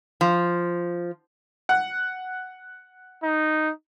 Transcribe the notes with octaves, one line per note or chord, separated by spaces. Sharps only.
F3
F#5
D#4